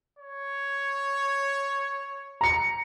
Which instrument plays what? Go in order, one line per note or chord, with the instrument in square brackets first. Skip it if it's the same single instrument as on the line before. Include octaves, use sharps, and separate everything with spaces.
[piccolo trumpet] C#5
[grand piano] A#5 C#7